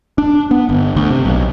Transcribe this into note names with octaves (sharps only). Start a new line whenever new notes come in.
D4
B3
G1
D2
C3
B1